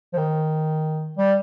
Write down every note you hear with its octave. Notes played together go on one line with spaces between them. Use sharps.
F3
D#3
G3